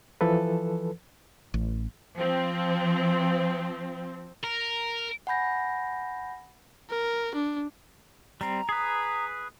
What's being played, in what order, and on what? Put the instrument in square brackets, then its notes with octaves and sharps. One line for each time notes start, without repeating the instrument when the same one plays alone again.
[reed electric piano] E3 F3 A4 B4
[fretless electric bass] A1
[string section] F3 C4
[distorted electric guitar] A#4
[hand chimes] F#5 G#5 B5 G6 A#6
[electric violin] A#4
D4
[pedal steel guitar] G3 C4 [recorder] A#5
[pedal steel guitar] G#4 B4 [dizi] D#6